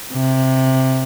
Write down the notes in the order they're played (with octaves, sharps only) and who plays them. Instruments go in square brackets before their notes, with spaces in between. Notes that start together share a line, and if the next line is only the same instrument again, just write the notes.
[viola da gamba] C3